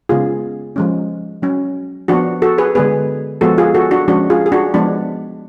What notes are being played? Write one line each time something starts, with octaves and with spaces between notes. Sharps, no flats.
C#3 G#3 B3 F4 G#4
F3 G#3 C#4
F#3 C#4
F3 B3 D4 F#4
F#4 A4
G#4 B4
D3 G#3 B3 G#4 B4
F3 G#3 B3 F#4 A4
F4 G#4
F#4 A4
D4 F#4
F3 G#3 C#4 D4 F#4
F4 G#4
G#4
D4 F#4
F3 G#3 B3 D4